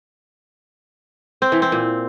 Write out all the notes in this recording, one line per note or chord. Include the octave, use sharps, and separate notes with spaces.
C4
E3
C4
A#2